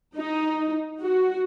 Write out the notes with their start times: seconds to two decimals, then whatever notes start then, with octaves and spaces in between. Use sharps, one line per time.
0.15 D#4
1.01 F#4